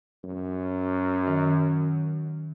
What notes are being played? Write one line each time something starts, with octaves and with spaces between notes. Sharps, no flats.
F#2
D#3